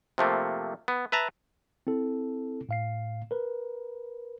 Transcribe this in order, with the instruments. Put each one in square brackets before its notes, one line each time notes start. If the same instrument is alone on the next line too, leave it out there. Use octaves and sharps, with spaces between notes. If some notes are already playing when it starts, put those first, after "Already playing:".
[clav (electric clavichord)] C3 F3 A3 A#3
B3
B4 E5 A5 A#5
[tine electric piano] C4 E4 A4
A2 F5 C7
A#4 B4